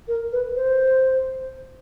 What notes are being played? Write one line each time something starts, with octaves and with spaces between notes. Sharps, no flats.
A#4
B4
C5